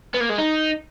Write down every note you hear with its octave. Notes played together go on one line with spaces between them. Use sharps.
B3
A#3
G#3
D#4